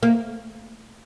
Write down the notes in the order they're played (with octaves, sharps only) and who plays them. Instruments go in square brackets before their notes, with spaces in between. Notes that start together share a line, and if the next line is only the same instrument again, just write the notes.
[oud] A#3